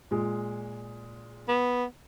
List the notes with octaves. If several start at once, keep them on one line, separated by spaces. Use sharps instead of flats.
A#2 G#3
B3